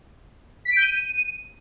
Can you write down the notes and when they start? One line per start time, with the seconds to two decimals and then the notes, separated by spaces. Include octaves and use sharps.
0.65 B6
0.71 D7
0.77 G6
0.82 D#7